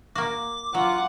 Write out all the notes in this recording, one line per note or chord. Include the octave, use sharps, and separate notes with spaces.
A#3 F#4 D6
F#3 F4 F#5